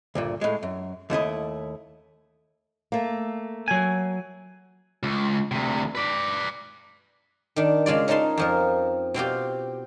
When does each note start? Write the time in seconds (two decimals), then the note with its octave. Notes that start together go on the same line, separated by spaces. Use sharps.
0.15 D2 G2 A#2
0.41 A2 G#3
0.63 F#2
1.10 D#2 A3 E4 D#5
2.92 A3 A#3
3.68 F#3 G#5
5.03 C#2
5.51 D2 C3
5.95 B4 D5
7.56 D#3 D4
7.86 C#3 G#3 F4 D5
8.08 C#4 D#4 A#4 A5 C6
8.37 F2 F3 A#4
9.14 B2 C4 F4 G4